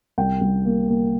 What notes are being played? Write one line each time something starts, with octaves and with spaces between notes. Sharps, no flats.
C2 G5
C2
A#3
A#3